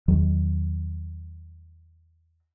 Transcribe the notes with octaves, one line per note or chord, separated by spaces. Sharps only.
E2 D#3 F#3